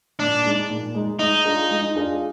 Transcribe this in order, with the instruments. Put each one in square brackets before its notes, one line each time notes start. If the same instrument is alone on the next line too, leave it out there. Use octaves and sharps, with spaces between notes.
[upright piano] A#2 [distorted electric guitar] D4
[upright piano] G#3 D#4
A#2
G#3 D#4
[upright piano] G#3 [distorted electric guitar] D#4
[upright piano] D4 F4 G#4
G#3
D4 F4 G#4